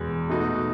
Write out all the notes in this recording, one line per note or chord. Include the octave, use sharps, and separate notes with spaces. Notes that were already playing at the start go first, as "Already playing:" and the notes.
Already playing: E2 B2 G#3
B2 A3 D#4 F#4